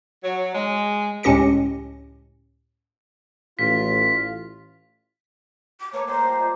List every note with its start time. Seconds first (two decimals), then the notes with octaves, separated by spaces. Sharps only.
0.23 F#3
0.55 G#3
1.23 C#2 A2 C#4 G4 A#6 C#7
3.59 A1 F4 B6
5.80 D6
5.93 A3 A#3 B4 C#5
6.07 G3 A#4 C5 A#5
6.23 F3 G4
6.39 G#4 D5 D#5